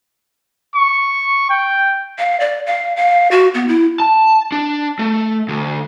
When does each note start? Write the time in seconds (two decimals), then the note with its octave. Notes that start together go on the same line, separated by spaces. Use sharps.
0.75 C#6
1.49 G5
2.19 F5
2.40 D5
2.66 F5
2.96 F5
3.31 F#4
3.54 B3
3.68 E4
4.00 A5
4.52 D4
4.99 A3
5.49 D2